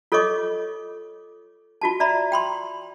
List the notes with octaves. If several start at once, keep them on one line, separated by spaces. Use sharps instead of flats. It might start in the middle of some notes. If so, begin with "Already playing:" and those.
F4 A4 C#5 D#5 C#6 D6
F4 F#4 A5
D5 E5 A#5 B5
G5 B5 C6